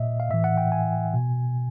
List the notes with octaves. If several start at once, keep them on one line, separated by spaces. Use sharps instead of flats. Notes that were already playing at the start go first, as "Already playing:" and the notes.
Already playing: A#2 D#5 E5
F5
A2 E3 E5
F#5
G5
G#5
B2